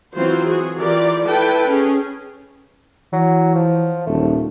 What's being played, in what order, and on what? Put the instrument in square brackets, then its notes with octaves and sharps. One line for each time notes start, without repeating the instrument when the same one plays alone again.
[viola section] E3 F#3 C4 F4 C5
F#4 G#4
E3 F4 G4 A#4 D5
E4 A4 B4 G5 A5
C#4 G#4
[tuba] E3 [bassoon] F#3
[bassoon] F3
[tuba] D#1 [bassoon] A3